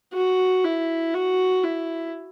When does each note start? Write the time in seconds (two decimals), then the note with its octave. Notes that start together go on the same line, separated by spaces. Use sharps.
0.13 F#4
0.64 E4
1.14 F#4
1.64 E4